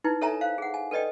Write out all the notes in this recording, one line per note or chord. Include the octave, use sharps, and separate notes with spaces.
D#4 E4 B4
A4 C#5 E5 G#5 A#5
C5 F5
G#4 F#5
G#5
A4 B4 D5 D#5 G5